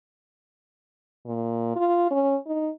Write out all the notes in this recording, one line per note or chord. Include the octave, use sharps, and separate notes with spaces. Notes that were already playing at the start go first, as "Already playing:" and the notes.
A#2
F4
C#4
D#4